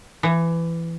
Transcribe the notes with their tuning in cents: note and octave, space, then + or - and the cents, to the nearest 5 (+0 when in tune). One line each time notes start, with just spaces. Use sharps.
E3 +20